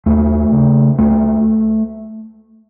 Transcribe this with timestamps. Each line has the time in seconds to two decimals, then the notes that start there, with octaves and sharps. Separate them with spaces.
0.06 D#2 A3
0.52 C#3
0.98 C#2 A3